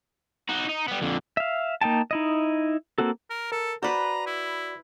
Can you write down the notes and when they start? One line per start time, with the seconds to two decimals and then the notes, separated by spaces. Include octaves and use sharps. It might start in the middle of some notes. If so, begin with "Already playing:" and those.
0.49 D#4 F#4
0.69 D#4
0.88 G3 B3
1.02 F2 D3
1.37 E5 F5
1.81 A#3 D#4 G5 A5
2.11 D#4 E4 D#5
2.98 A#3 C4 F#4 A4
3.30 A#4
3.52 A4 A#4
3.83 F#4 B4 C5 D5 A#5
4.27 E4